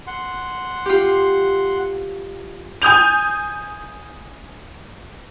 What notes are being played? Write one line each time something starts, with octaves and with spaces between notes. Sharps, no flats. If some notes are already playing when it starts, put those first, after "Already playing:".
F#5 C6
F4 G4
G#5 D#6 G6 F7